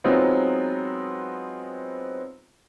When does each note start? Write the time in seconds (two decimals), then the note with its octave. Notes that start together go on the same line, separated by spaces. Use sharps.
0.04 F#3 G#3 B3 C4 D#4 F4